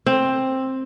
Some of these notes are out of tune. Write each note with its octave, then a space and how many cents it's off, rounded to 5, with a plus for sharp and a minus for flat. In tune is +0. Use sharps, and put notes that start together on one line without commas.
C4 +10